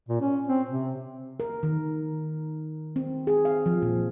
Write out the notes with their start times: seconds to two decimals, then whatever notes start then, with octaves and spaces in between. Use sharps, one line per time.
0.09 A#2
0.20 C#4
0.47 C4
0.69 C3
1.40 A#4
1.63 D#3
2.96 C4
3.27 G#4
3.45 F5
3.66 F3
3.82 A#2